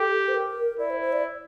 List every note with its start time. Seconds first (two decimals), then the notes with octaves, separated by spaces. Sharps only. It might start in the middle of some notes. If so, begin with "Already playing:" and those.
Already playing: G4 A4
0.28 C5
0.35 A#4
0.79 E4 D5
0.90 C5
1.01 C5
1.13 D5